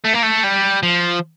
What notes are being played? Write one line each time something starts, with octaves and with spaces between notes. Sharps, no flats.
A3
A#3
A3
G3
F3